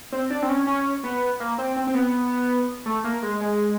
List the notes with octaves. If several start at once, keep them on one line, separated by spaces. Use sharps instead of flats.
C4
D4
C4
C#4
C#4
B3
A#3
C4
C4
C4
B3
A3
A#3
G#3
G#3